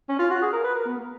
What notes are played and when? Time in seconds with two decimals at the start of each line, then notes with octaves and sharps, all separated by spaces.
0.09 C#4
0.19 F4
0.31 F#4
0.42 G#4
0.53 A#4
0.64 B4
0.75 A#4
0.86 B3
0.97 A#3